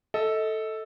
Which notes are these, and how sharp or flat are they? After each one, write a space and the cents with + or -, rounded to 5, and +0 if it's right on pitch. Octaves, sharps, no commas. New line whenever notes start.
A4 +0 D#5 +30